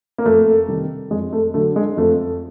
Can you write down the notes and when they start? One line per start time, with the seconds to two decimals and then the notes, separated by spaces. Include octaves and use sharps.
0.18 A#3
0.25 F2 A3
0.68 C3 D#3 G3
1.11 F2 G#3
1.33 A3
1.54 D3 F#3 A3
1.76 G#3
1.97 F2 A3